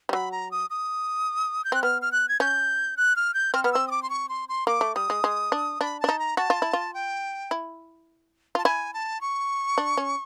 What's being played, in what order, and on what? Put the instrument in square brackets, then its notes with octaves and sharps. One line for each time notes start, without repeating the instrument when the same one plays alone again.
[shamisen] G3
[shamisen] F#3 [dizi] B5
[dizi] A#5
D#6
D#6
G6
[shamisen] C4 [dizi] F#6
[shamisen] B3 [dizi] F6
[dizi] F6
F#6
G#6
[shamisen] C#4 [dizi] G6
[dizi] F#6
F6
G6
[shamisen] C4 [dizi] F6
[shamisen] B3 [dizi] F6
[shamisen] C4 [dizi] E6
[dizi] D#6
D6
C6
C#6
C6
C6
[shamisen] A#3 [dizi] D6
[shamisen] A3
[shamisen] G3 [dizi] D#6
[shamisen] G#3
G#3
D4
[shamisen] D4 [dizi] B5
[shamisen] D4 [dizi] A5
[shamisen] D#4
[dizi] A#5
[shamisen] F#4 [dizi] A5
[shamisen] F4
E4
F4
[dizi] G5
[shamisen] E4
[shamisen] F4 [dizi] A5
[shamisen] E4 [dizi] G#5
[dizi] A5
C#6
[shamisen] D4
C#4